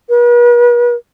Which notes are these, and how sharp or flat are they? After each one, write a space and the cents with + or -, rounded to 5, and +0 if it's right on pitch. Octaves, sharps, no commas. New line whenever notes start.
B4 -45